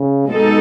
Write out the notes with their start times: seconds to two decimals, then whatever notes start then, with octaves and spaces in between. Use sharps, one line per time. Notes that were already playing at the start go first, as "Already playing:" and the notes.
Already playing: C#3
0.27 B2 G#3 D#4 A4